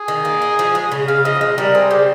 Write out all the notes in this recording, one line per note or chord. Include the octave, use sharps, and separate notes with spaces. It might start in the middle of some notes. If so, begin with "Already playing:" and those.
Already playing: G#4
D#3
A#3
D#4
F3
G#3
C#3
C#3 F5
F3 D#5
G#3
G3 A#4
C4 G#4
C#3 G4